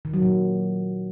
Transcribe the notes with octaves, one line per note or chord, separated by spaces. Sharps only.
D#3
F#3
A#2